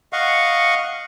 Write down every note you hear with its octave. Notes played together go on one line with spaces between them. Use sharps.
D#5 F5 F#5 C#6